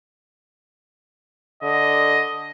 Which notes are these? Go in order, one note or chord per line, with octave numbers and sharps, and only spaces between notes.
D3 D#5